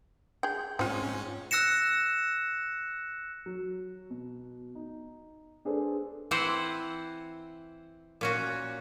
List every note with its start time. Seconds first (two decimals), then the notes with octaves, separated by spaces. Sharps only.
0.43 G#4 G5
0.79 G#2 C4 C#4 F4
1.51 E6 F#6 A#6 C#7 E7
3.46 F#3
4.10 B2
4.75 D#4
5.65 D4 G#4 A4 B4 C5
6.31 E3 C4 E4 C5 F#5
8.21 A#2 C#4 F#4